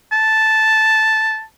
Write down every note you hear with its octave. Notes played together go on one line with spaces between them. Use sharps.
A5